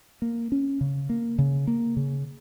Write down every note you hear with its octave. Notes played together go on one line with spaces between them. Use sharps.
A#3
C#4
C#3
A#3
C#3
A#3
C#3